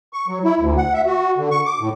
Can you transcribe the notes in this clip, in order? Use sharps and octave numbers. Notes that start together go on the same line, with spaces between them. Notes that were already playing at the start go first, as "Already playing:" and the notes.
C#6
F#3
E4
D2
F#5
E5
F#4
D3
C#6
D6
A2